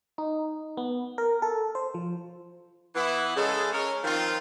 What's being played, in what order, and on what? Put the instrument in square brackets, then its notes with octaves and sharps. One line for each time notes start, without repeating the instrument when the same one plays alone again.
[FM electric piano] D#4
B3
A#4
A4
C5
F3
[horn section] E3 B3 E4
C#3 G#3 G#4 A4
C#4 A#4 C#5
D#3 F3 C4 F4